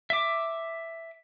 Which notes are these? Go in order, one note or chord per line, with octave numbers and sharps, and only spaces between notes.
E5 D6